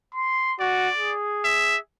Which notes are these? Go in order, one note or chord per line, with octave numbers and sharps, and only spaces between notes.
C6
F#4 D5
G#4
E5